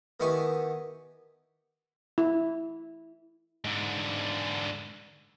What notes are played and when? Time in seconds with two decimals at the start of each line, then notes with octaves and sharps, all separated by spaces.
0.20 D#3 B3 E4 G4 G#5 C#6
2.18 E4
3.65 G#2 D3